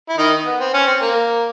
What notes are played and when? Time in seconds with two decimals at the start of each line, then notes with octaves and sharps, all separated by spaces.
0.09 E4
0.17 D#3 D#4
0.46 B3
0.60 C4
0.74 C#4
0.86 C4
1.01 A#3